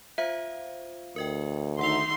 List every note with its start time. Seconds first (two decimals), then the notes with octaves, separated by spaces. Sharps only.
0.18 F4 C5 E5 F5
1.16 D2 A#4 D#5 G5
1.79 D#3 D#4 E5 F#5 C6 F7